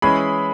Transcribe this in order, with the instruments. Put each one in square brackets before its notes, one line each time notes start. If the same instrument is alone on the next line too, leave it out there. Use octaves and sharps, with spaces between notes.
[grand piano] E3 G#3 C#4 E4 G#4 [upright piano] B5